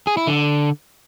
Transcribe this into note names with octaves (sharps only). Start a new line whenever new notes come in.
G#4
E4
D3